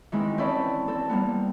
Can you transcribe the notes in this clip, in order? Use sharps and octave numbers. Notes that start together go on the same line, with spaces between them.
D#3 E3 G#3 C4 E4
C4 C#4 E4 A4 B4 D5
C4 A4
G3 A#3 B3